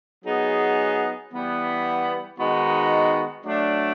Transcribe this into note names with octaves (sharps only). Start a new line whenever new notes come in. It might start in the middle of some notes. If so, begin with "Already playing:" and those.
F#3 B3 D#4 G#4
E3 G3 B3
D#3 G#3 B3 D#4 F#4
F#3 A3 D4